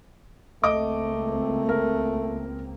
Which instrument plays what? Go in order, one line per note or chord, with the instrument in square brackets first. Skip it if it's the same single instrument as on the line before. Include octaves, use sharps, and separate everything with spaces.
[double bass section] C#2 A#3 C4 [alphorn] A3 [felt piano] D#5 D6
[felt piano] A#4